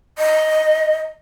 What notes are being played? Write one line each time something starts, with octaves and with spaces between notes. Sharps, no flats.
D#5